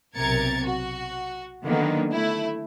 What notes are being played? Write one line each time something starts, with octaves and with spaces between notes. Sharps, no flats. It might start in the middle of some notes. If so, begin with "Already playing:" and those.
B1 C3 A#4 G#6 A6 C#7
F#4
D3 D#3 F#3 A#3 B3
A3 E4